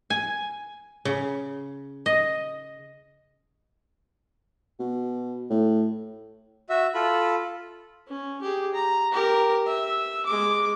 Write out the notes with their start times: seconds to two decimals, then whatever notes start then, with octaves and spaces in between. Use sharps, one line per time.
0.10 G#5
1.05 C#3
2.06 D#5
4.79 B2
5.50 A2
6.69 F#4 E5
6.94 F4 A4 B5
8.08 C#4
8.42 G4 G#4
8.74 A#5
9.12 G4 A#4
9.66 E5
10.25 G#3 D6